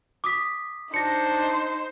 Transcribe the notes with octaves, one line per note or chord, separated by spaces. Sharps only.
D6 D#6 B6
D4 D#4 C5 A#6 C#7